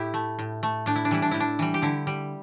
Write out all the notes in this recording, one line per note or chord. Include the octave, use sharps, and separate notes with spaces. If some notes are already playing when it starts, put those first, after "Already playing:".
Already playing: A2 E4 G4
A3
A2
A3
A2 D4
E4
D4
E3 G3 E4
D4
A2 E4
D4
E3 G3
G4
D3 E4
G3